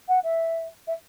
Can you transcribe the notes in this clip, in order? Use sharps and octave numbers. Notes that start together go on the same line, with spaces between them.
F#5
E5
E5